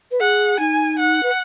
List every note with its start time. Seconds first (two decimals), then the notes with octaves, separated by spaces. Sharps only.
0.11 B4
0.20 G#4 F#5
0.59 D#4 G#5
0.99 F#5
1.23 B4